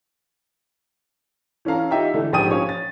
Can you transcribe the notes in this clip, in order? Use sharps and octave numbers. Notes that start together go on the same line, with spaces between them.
E3 C#4 A4 F5 A#5
D#4 F4 G4 D#5 E5
D3 E3 A3
A#1 G#2 G4 G#5 D#6 D#7
F3 C#4 C#5 F5
A6